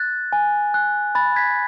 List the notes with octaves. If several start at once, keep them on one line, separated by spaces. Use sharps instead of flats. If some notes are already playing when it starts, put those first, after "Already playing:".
Already playing: F#6 A6
G#5
F#6
B5 A6
G#6 B6